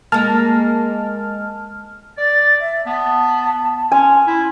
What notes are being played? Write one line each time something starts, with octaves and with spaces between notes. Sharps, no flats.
G#3 A#3 A5 F6
D5 A6
E5
B3 A5
C#4 G#5 C6
E4